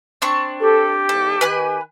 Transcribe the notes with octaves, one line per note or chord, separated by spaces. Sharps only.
C4 D4 C#6
G4 A4
E2 G#2 A4
D#3 B4 G#5 F#6